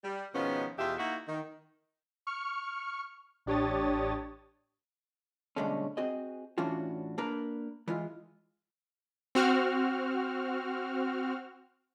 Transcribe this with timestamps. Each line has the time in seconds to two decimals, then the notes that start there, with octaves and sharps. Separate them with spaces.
0.03 G3
0.33 B2 D#3 F3 G#3 B3 C#4
0.78 E2 B2 F4 G4 D#5 E5
0.98 A#3 D#4 E4 F#4
1.27 D#3
2.27 C#6 F6 C#7
3.46 A1 D4 G4 C#5 D#6 A6
5.56 G2 B2 D3 G#3 A3 C#4
5.97 C4 F#4 G#4 D#5
6.58 A2 E3 C#4 D4 F4 F#4
7.18 A#3 D4 A#4 B4
7.88 E3 G#3 F4
9.35 C4 F#4 F6